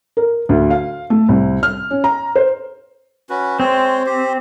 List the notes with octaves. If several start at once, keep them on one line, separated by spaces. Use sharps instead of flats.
A#4
D2
F5
A3
C2
F6
C#4
A#5
C5
C#4 F#4 B4
G#3 C4 C5 C#5
G4 C5